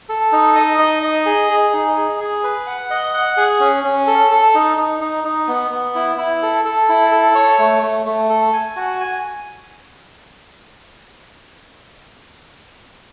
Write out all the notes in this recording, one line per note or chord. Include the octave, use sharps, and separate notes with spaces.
A4
D#4
D#5
D#4
D#5
G#4
G#4
D#4
G#4
G#4
B4
F#5
D#5
F#5
G#4
C#4
C#4
A4
A4
D#4
D#4
D#4
D#4
B3
B3
E4
E4
A4
A4
E4
A4
C#5
A3
A3
A3
A4
G#5
F#4
G#5